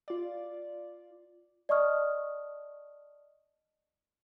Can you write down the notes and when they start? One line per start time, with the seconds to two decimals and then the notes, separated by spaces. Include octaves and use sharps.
0.08 F4 D5
1.69 D5 D#5 A5 C#6 D#6 F6